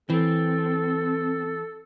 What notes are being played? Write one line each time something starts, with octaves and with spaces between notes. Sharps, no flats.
E3 C4 A4